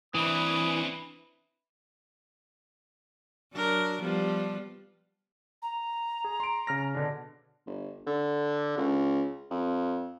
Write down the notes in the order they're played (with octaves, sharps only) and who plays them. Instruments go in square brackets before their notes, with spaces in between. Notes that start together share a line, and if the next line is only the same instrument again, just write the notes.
[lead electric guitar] E3 [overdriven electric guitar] C4 D4 [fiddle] E4 B4 [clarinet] D#6
[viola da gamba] F#3 D4 A#4
F3 G3 B3
[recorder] A#5
[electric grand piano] G#4
C6 D7
C#3 F6 A#6
B2 D3 D4
[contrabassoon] G1
D3
C#2
F2